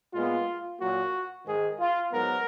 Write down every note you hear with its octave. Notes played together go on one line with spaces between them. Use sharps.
A#2 G#3 B3 F4
A#2 F#3 A#3 F#4
G#2 D#3 G#3 G#4
F4
G#2 F#3 B3 A#4